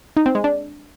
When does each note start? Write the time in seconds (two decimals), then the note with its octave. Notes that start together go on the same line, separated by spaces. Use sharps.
0.17 D#4
0.26 C4
0.35 G#3
0.44 D4